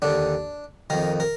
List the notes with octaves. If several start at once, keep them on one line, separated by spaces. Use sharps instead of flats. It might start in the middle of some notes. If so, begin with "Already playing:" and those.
D#2 D3 D4
F2 D#3 A#4
A#4